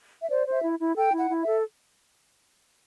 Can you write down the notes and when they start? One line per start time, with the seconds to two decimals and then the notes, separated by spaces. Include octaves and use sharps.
0.21 E5
0.30 C5 D5
0.46 C5
0.51 E5
0.62 E4
0.79 E4
0.96 A4 G5
1.13 E4
1.18 F#5
1.30 E4
1.41 E5
1.47 A4